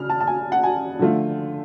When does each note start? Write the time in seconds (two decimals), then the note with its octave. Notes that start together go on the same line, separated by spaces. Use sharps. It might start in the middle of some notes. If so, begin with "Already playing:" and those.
Already playing: C#3 F6
0.09 A5
0.20 A5
0.27 G#5
0.52 F#5
0.64 G#5
0.99 D3 F3 A3 F4